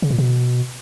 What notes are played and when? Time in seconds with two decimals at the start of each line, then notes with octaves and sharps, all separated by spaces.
0.02 C#3
0.10 A#2
0.18 B2